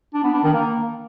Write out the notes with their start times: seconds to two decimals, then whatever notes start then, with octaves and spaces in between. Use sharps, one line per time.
0.14 D4
0.24 B3
0.34 D4
0.44 D#3
0.54 A#3